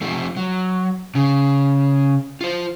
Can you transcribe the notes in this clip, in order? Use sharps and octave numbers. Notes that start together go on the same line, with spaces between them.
F3 A3
F#3
C#3
F4 C5